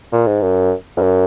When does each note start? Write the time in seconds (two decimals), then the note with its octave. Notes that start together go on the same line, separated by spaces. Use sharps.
0.12 A#2
0.27 G#2
0.42 F#2
0.97 F2
1.01 F#2